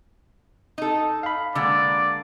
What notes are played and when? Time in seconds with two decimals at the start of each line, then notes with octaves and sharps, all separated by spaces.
0.78 D#4 A4
1.23 F5 B5
1.55 D3 G#3 A#3 D5